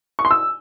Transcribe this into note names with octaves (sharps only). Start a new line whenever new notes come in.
C#6
C6
E6